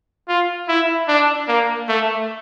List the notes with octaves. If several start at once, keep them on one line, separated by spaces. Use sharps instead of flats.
F4
E4
D4
A#3
A3